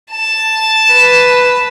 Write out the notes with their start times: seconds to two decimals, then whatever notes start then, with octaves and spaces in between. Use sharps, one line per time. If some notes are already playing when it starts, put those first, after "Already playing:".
0.11 A5
0.92 B4